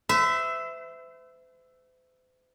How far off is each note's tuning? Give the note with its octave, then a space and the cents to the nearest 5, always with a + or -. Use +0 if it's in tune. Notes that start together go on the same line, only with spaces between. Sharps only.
C5 -45 E5 +0